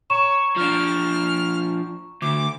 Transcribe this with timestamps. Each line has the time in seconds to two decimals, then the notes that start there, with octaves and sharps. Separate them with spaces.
0.10 C#5 A#5 C#6 E7
0.57 F3 D4 F6
2.22 D2 D6